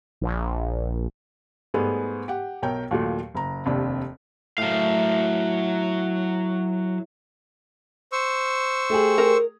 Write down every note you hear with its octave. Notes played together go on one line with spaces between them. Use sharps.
A#1
G#2 G3 A3 B3 G#4
G4 F#5
B1 A#4 C#5 G5
D#2 A#2 F#3 A3
F#1 A#5
F1 D#2 C3 D4
A2 F#3 F5
C5 C#6 E6
A3 G4 G#4
A#4